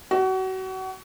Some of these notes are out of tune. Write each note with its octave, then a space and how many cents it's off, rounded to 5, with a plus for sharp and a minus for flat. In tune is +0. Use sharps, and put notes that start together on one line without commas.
F#4 +30